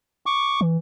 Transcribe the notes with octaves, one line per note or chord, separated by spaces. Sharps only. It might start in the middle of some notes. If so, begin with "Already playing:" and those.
C#6 D6
E3